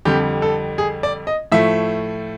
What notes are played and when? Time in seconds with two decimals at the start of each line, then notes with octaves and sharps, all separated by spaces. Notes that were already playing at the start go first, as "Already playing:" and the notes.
0.05 F2 D3 G3 G4
0.42 A4
0.78 G#4
1.03 D5
1.27 D#5
1.52 A2 F3 A3 E5